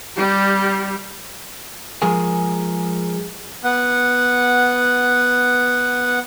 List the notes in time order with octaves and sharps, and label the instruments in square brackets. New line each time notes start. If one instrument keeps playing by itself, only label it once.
[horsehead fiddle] G3 G4
[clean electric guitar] F3 G#3 G#4 A#4 G#5
[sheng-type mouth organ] B3 F#5